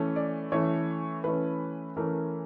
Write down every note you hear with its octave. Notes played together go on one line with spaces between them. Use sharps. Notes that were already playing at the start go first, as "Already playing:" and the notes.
Already playing: E3 A3 C#4
D5
E3 A3 C#4 C#5
E3 A3 C#4 B4
E3 A3 C#4 A#4